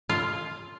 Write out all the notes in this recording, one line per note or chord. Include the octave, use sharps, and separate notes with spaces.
F4